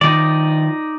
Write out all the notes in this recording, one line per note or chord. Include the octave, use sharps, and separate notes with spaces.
D#3 F3 D#4 D5